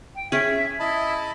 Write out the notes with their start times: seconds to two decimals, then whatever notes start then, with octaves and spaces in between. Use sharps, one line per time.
0.15 G5
0.32 C#4 G#4 E5
0.80 E4 D#5 A5 B5